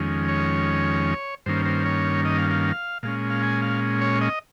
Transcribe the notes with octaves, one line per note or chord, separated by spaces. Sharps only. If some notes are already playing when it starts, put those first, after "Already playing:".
Already playing: F2 D#3 G#3 C#4
C#5
G2 D#3 A#3 C#4 C5
C5
C#5
D#5
F5
F5
A#2 G#3 C#4 F5
F5
G#5
F5
C#5
D#5